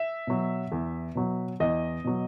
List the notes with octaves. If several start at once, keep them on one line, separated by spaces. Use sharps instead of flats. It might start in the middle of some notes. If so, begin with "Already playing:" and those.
Already playing: E5
B2 F#3
E2
B2 F#3
E2 D#5
B2 F#3